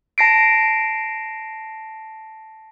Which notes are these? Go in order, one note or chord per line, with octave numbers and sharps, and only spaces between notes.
A5 A#6 C7 D7